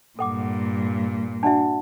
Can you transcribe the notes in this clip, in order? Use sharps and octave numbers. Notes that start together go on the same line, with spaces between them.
G2 A#2 A4 F#5 D6
D4 F#4 D5 E5 F#5 A5